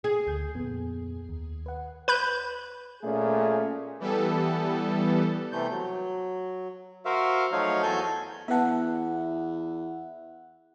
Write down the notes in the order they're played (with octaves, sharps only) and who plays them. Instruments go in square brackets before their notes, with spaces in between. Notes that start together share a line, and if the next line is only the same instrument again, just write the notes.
[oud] G#4
[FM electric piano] D2 G6
F2 A#2 B3
D#2
B4 F#5
[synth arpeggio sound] B4 B5 G6
[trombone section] A#2 A3 C#4 G#4
[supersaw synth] E3 G3 B3 A4
[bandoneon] C3 E3 A3 G6
F#3
F#4 A#4 C5 E5 F5
F3 F#3 A3 D#4 C#5 F5
E2 F#3 F#4 A4 G#5 G6
[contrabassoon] E2 [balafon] B3 B4 A5 [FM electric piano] E5 F#5